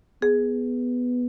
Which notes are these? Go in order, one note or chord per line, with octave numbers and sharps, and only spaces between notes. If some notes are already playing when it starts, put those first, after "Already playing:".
B3 G#4